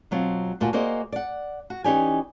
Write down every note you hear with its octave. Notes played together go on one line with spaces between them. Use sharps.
B2 F#3 C4 F4
D2 A#2 F4 F#4 G#5
A#3 F#4 G#4 C5 D5 D#5
D5 F#5
F#4
E3 C#4 D#4 G4 D5 G#5